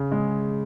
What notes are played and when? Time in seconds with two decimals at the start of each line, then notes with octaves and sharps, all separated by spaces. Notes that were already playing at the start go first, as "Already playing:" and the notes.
Already playing: C#3
0.12 G#3